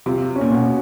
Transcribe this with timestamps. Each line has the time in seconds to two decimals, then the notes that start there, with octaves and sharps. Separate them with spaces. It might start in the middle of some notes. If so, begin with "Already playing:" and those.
0.06 C3 F4
0.36 C#4
0.41 A#2
0.52 B2